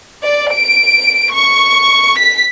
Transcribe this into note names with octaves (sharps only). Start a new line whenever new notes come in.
D5
D7
C#6
B6